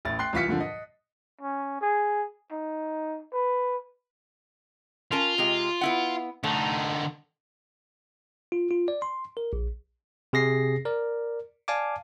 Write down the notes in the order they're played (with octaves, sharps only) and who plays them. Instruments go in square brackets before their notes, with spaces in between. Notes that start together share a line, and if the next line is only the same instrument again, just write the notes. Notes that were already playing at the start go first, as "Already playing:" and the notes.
[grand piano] A1 A2 A6
G5 C6 F#6 C7
C2 E3 F4 F5 B6 C#7
G2 A#2 D3 F3
D#5
[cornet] C#4
G#4
D#4
B4
[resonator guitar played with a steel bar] C#4 A#4 A5 [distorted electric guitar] F4
[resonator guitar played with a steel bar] C3 G#3 G4
B3 E4 F#5
[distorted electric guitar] D3 D#4 [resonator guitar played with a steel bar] A3
[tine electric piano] F4
F4
D5
C6
A#4
A#1
C3 G#4 A#6 C7
A#4 D5
D5 F5 G#5 A5 D6